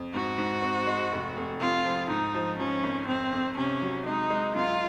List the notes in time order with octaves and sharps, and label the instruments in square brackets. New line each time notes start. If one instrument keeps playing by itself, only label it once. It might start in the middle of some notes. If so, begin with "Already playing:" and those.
Already playing: [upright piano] F2
[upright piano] G#2 [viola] F#4
[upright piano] G#2
C4
G#3
F1
F1
[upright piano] F2 [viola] F4
[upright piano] F3
[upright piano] G#2 [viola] D#4
[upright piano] F3
[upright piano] F3 [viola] C#4
[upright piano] G#1
[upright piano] F2 [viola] C4
[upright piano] F2
[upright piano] C3 [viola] C#4
[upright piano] F#3
[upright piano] G#3 [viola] D#4
[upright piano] G#3
[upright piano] F#2 [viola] F4